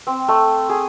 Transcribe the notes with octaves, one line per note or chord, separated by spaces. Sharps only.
C4
A3
G#4